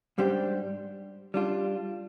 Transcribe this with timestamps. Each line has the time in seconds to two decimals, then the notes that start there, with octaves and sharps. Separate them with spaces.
0.18 G#2 G3 D4 G4 C5
1.34 G3 D4 F4